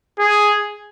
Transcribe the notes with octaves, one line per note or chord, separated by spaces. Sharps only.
G#4